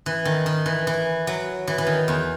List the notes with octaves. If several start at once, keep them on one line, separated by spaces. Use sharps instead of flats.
E3
D#3
D#3
E3
E3
F#3
E3
E3
D#3
E2